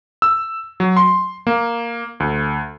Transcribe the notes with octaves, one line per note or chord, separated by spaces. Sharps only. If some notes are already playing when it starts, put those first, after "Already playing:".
E6
F#3
C6
A#3
D2